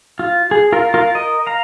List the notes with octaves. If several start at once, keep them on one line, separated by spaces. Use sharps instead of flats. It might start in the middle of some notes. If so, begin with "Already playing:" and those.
F4
G#4
F4 A#4
F4 A#4
A#4 D#5
F5 A#5